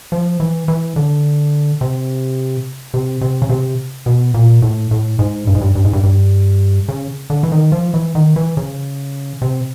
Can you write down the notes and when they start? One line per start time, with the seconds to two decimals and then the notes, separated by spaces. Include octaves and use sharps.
0.12 F3
0.40 E3
0.68 E3
0.96 D3
1.81 C3
2.94 C3
3.21 C3
3.42 C#3
3.49 C3
4.06 B2
4.34 A#2
4.62 A2
4.91 A2
5.19 G#2
5.47 G2
5.55 G#2
5.61 G2
5.75 G2
5.85 G#2
5.93 G2
6.03 G2
6.88 C#3
7.30 D3
7.43 E3
7.52 D#3
7.72 F3
7.94 E3
8.15 D#3
8.36 E3
8.57 C#3
9.42 C3